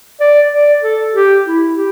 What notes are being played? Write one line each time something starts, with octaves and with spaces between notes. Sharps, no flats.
D5
D5
A4
G4
E4
G4